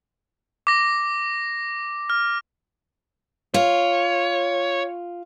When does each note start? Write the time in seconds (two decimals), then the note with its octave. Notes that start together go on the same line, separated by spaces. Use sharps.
0.67 D6 A#6
2.10 F6
3.54 F4 C#5